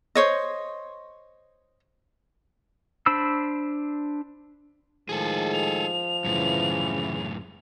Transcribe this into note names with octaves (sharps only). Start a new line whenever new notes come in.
C5 C#5 D#5
D4 C5 B5 E6
A2 D#3 F3 G#3 G#4 A4
F7
F#2 A2 C#3 E3